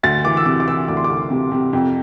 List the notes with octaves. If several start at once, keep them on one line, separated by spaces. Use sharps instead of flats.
D2 A6
E3 D6
E6
C3 D6
D6
E3 E6
D2 D6
C6
D2 D6
C3
C3
F2